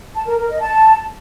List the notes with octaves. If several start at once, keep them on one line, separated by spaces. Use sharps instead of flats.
A5
A#4
A#4
D#5
A5